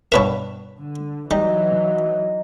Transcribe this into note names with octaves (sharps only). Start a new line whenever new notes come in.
G2 B2 A#4 B4 C#5 E5
D3
E3 F#3 G3 D#4